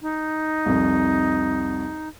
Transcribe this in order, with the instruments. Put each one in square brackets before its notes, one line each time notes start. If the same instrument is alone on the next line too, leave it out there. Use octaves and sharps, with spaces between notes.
[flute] D#4
[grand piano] C2 F2